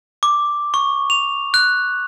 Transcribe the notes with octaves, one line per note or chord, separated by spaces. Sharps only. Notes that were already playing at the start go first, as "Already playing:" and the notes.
D6
C#6
F7
F#6